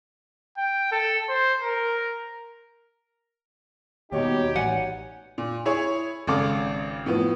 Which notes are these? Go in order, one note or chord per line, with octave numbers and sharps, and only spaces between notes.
G5
A4
C5
A#4
D#2 B2 D#4 F#4 G4 C#5
A1 D5 F#5 G#5
A#2
E4 G#4 C#5
G#1 C#3 A4 D6
A2 F3 B3